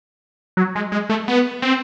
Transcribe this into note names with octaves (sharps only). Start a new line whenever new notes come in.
F#3
G#3
G#3
A3
B3
C4